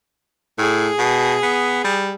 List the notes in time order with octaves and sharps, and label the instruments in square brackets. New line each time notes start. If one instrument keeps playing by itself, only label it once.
[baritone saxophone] A2 [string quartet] G#4
[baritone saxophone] B2
B3
G3